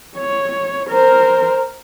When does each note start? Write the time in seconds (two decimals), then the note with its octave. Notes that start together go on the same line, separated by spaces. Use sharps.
0.17 C#5
0.89 A#4 C5